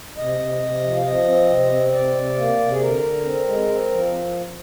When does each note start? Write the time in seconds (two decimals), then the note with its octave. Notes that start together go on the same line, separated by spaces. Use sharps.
0.17 C3 D#5
0.40 C3
0.62 C3
0.83 F3
0.96 F5
1.05 F3 D#5
1.27 C4
1.50 C3
1.71 C4
1.93 C3 D5
2.15 C3
2.37 A#3
2.59 C3
2.72 G#4
2.81 D3 A#4
3.03 D3
3.25 C4
3.47 G#3
3.69 C4
3.91 F3